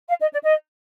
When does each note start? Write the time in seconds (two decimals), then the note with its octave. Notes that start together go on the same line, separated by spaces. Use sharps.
0.08 F5
0.20 D#5
0.31 D5
0.43 D#5